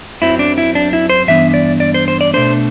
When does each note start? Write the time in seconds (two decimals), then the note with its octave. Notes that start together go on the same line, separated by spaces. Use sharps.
0.22 F#2 F#3 C4 E4
0.39 D4
0.58 E4
0.75 D4
0.93 E4
1.09 C5
1.28 G2 E3 B3 D4 E5
1.54 D5
1.80 D5
1.94 C5
2.08 C5
2.21 D5
2.34 B2 A3 D4 C5